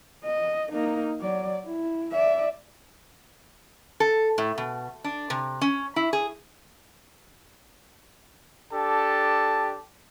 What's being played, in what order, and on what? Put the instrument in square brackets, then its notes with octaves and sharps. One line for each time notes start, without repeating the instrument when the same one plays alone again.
[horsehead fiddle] D#5
A#3 D#4
F#3 D5
E4
D5 E5
[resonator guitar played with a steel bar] A4
A2
B2
D4
C3
C#4
E4
G#4
[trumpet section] D4 G4 A4 A5